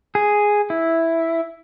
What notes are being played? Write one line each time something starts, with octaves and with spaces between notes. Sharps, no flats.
G#4
E4